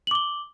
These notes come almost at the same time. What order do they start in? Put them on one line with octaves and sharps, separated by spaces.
F#7 D6 G7